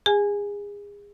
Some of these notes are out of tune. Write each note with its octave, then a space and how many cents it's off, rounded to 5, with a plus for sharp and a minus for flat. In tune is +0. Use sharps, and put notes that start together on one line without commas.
G#4 -30 G#5 +0